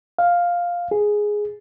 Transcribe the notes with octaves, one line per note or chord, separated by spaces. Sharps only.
F5
G#4